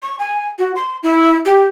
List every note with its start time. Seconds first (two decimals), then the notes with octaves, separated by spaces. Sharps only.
0.03 C#6
0.19 G#5
0.59 F#4
0.75 C6
1.03 E4
1.45 G4